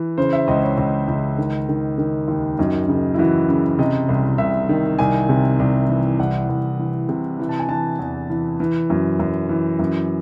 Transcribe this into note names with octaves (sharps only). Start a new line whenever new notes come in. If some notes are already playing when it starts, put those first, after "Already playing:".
Already playing: E3
C#3 C5
E5
C#2 D#5
C#5
C#2
C#2
D#3
D#3
D#3
D#2
F#2 D#4
C#3 D#4
E4
E3 F#4
C#3
C3 D#5
C2
C2 E5
D#3
C2 G#5
C3
C2
E3
C2 F#5
C2
E3
C3
E3
A5
G#5
E3 A5
E2
E3
E3
F#2
F#2
E3
F#2